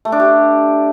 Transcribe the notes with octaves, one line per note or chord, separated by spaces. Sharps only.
A3
D4
G4